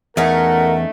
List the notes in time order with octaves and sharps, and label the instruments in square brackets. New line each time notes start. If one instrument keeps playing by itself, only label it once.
[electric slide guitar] E2 [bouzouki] A3 C#4 D#4 [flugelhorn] A#4 [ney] F#5